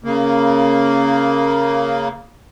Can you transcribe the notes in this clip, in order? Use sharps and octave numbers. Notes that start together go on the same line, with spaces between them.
C#3 A#3